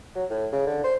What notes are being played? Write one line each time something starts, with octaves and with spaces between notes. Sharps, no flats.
F#3
A2
C#3
D3
C5